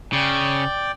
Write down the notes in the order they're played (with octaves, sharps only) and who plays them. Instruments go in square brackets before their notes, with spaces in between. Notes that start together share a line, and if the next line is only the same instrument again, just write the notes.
[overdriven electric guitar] C#3 [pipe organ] D5 G5